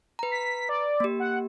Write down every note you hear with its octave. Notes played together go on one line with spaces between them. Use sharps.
B4 A#5
B6
D5
A#3 G4
F#5